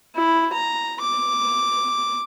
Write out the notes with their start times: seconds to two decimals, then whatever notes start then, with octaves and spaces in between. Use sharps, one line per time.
0.16 E4
0.52 A#5
1.01 D6